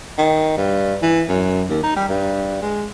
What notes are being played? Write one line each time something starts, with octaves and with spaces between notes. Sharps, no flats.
D#3
G2
E3
F#2
D#2
D#4
G3
G2
G#3